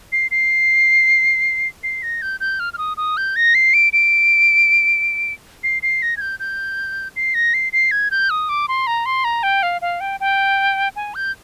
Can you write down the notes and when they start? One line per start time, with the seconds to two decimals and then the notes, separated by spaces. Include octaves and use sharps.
0.12 C7
0.31 C7
1.83 C7
2.03 A#6
2.22 G6
2.40 G6
2.60 F6
2.73 F6
2.78 D#6
2.97 D#6
3.17 G6
3.36 A#6
3.55 C7
3.74 D7
3.93 D7
5.63 C7
5.82 C7
6.02 A#6
6.17 G#6
6.21 G6
6.40 G6
7.16 C7
7.34 A#6
7.54 C7
7.73 C7
7.91 G#6
8.11 G6
8.30 D#6
8.49 D6
8.68 C6
8.87 A#5
9.06 C6
9.24 A#5
9.43 G5
9.63 F5
9.82 F5
10.00 G5
10.20 G5
10.96 G#5
11.15 G6